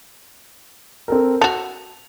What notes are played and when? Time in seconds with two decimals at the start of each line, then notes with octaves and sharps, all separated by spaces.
1.08 C4 A4 A#4
1.41 F#4 A4 F7